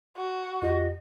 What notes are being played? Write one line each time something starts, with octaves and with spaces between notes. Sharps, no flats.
F#4
F2 F4 G4 D#5